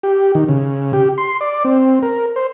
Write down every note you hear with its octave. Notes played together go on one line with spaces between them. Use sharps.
G4
D#3
C#3
G4
C6
D5
C4
A#4
C5